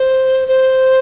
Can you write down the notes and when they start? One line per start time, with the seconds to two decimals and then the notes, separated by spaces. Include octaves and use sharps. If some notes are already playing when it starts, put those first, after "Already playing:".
Already playing: C5
0.48 C5